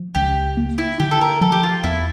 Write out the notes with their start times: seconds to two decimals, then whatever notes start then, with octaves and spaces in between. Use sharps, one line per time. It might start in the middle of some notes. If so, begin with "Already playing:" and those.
Already playing: F3
0.15 C#2 G4
0.57 A#3
0.78 E4
1.00 D3 G4
1.11 A4
1.21 A#4
1.41 F3 A4
1.52 G4
1.63 F4
1.84 E2 E4